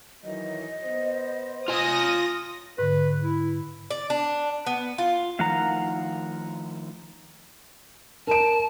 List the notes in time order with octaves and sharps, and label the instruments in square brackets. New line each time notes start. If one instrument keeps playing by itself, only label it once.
[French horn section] D#3 E3 F#3 [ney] D#5
[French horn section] B3 C5
[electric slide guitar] F4 G#5 [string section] D#6 A#6
[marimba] G#2 D3 [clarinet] B4
[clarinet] E4
[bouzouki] D5
D4
B3
F4
[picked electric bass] D#3 F3 A3 [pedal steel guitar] F5 F#5 A#5
[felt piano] A#4 D7 [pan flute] A5